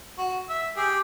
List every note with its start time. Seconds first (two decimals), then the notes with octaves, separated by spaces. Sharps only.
0.18 F#4
0.49 E5
0.77 G4 G#4